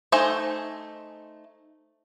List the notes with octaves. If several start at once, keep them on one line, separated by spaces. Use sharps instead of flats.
A3 D#4 C5 E5 G#5